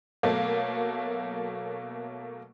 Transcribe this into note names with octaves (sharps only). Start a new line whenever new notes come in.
B2 F#3 A3 A#3